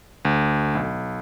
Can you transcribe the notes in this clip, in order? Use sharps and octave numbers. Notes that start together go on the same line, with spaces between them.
D2
B1